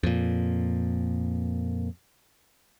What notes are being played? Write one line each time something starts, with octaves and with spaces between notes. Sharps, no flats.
F2 A#2